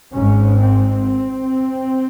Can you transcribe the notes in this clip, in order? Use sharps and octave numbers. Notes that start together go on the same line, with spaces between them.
G#1 G#2 C#4
C4